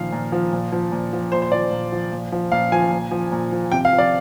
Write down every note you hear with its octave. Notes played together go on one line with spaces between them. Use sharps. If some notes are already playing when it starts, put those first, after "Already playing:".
Already playing: A#2 D#3 F3 F5
A#2
F3
A#2
F3
A#2
F3
A#2 C5
C5
F3 D5
A#2
F3
A#2
F3
A#2 F5
F3 G#5
A#2
F3
A#2
F3
C3 G5
F5
F3
D5